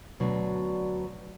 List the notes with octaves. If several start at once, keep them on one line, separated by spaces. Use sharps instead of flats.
D2 B2 F#3 D4